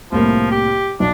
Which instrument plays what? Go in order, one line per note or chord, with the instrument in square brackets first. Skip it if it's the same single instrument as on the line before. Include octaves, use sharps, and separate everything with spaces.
[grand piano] C2 A2 A#3 [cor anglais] F3
[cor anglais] G4
[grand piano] B1 [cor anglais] D4